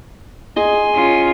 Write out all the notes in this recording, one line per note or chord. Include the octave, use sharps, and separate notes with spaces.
G#4 D#5 G#5 C6
C#4 F4